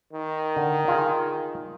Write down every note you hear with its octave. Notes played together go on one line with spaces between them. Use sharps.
D#3
D3
F4 G#4